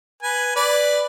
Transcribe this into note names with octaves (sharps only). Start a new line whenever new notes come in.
B4 G#5
B4 D5